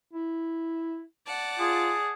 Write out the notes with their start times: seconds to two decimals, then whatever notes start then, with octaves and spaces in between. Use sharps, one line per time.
0.13 E4
1.26 D5 F#5 A5
1.59 F4 G#4